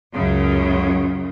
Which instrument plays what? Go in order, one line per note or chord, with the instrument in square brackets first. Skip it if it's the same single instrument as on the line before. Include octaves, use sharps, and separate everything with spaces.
[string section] C#2 F#2 C#3